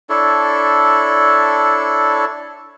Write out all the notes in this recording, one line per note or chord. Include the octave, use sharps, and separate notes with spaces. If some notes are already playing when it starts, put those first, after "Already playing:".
D4 E4 A4 C#5